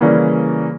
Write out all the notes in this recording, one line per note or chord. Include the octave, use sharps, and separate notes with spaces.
C#3 E3 G3 A#3 C#4